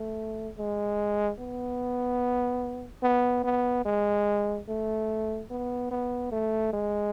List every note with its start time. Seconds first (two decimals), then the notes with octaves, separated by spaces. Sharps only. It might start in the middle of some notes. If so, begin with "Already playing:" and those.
Already playing: A3
0.58 G#3
1.39 B3
3.03 B3
3.44 B3
3.85 G#3
4.68 A3
5.51 B3
5.91 B3
6.32 A3
6.73 G#3